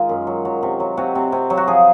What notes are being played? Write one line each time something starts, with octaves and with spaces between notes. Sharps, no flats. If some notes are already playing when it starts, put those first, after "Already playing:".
Already playing: D#3 G#3 D#4 F4
F#2
F#3
F#3
C3
F#3
C3 F#4
C3
C3
F#3
F#4
F3 G#4